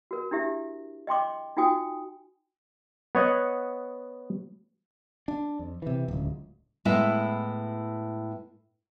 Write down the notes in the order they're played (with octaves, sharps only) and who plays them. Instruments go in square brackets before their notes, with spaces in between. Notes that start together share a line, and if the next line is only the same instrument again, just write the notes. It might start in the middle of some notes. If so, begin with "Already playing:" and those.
[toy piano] F#4 A#4
D4 E4 G4 E5
D#5 G5 C6 D6
D#4 F4 F#4 G5 G#5 D#6
[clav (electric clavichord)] B3 C#5 D#5 F#5
[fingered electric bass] D4
F2
C3 E3
D1 C#2
[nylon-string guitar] A2 G#3 B3 E4 E5